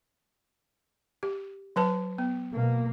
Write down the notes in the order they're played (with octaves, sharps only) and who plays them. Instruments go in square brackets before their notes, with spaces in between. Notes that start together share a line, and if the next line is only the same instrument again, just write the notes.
[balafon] G4
F#3 B4 A5
B3
[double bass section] B2 A#3